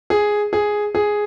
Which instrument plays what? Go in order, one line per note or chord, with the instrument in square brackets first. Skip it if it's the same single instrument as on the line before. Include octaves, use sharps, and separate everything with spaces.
[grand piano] G#4
G#4
G#4